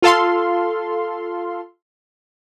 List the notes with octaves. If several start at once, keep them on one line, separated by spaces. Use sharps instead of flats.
F4 A4 F5 C6